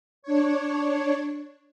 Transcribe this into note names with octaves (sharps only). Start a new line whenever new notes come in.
D4 C#5